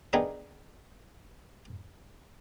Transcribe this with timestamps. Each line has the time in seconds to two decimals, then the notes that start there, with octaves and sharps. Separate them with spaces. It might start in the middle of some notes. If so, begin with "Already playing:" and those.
0.13 B3 D4 D#4 G4 G#4 A#4